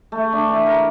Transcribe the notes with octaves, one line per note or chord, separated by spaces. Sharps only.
A3
D4
E3
A#4